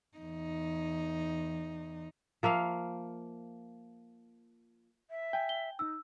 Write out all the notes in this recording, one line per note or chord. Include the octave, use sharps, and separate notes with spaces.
E2 D#4
F3 A#3 E5 F5
E5
G5 G#5
G7
D#4 E6